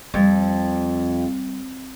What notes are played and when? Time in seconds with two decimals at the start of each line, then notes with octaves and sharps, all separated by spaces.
0.14 F2 G3